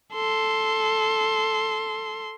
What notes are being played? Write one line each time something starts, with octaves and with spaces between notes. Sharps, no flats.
A4 C6